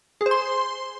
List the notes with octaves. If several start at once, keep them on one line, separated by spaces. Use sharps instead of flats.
G#4
C5
C6